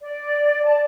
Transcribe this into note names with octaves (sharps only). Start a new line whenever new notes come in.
D5
A5